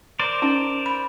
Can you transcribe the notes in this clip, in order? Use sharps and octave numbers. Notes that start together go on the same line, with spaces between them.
A#4 C5 D5
C#4 D#4
B5